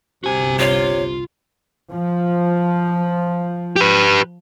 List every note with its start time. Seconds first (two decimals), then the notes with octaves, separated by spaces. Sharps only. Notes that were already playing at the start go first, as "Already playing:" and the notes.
0.24 G1 C2 C3 F#4 G#5
0.59 F4 C#5
1.92 F3
3.76 G4 B4